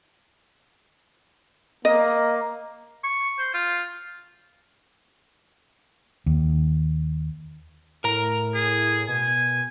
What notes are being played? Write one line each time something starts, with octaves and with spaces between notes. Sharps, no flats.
A#3 D#5
C#6
C5
F4
D#2
A2 A#4 A#5
G#4
B2 G#5